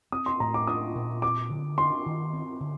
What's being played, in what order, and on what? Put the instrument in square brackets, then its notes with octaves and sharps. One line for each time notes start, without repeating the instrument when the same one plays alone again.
[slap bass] C4 [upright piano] D#6
[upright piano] C6
[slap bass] A2 [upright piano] A#5
[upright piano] D6
[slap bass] D4 [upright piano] D#6
[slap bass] A#2
[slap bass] C4 [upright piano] D6
[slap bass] D3
[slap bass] D4 [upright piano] C6
[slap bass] D#3
C4
D3